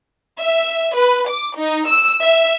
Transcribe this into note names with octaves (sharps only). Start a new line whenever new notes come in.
E5
B4
D6
D#4
E6
E5